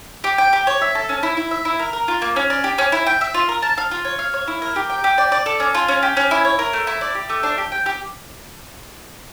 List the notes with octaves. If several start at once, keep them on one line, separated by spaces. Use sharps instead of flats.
G4
G5
G4
C#5
E5
A4
C#4
E4
E4
E5
E4
A#4
A#4
F4
A#3
C#4
D5
G4
C#4
E4
G5
E5
F4
A#4
A5
F5
F4
C#5
F5
C#5
E4
A#4
G4
G5
G4
D5
D5
A4
C#4
F4
C#4
G4
C#4
E4
C#5
A#4
A3
E4
D5
G4
A3
D4
G4
G5
G4